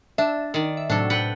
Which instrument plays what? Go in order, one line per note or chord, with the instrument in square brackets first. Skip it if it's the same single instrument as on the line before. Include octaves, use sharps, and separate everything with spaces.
[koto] D4 [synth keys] E5
[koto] D#3 D5
[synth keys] E5
[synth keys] A2 C3 F#3 [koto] D4 A4
[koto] B4 F#5 G5